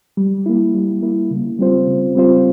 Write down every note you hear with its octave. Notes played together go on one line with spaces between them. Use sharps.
G3
A#3 E4
G3
A#3 E4
C#3
G3 C4 F4 C5
C#3
G3 C4 F4 C5